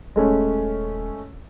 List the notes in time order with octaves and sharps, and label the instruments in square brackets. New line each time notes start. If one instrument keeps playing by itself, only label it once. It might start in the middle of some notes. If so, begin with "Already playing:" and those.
[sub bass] D#1 [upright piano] G#3 A3 C#4